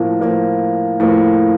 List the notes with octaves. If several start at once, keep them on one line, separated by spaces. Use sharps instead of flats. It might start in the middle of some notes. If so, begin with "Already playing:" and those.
Already playing: A2 F3 A#3
A2 F3 A#3
A2 F3 A#3